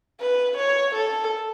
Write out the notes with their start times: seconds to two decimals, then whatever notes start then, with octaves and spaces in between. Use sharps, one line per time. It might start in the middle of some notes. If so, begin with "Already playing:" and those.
0.21 B4
0.57 C#5
0.95 A4